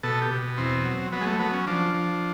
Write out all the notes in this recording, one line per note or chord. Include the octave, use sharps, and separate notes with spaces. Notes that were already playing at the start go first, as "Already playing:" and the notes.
B2 A4
G4
B2
E2 C4
F#3
F#3 B3
G#3
A3
F#3 B3
C#4
F3 D4
F3